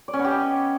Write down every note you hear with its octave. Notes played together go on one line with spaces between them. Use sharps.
D5
C#4
B3
G4
D#5